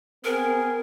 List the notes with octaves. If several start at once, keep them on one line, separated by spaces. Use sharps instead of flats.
B3 C4 G#4 A#4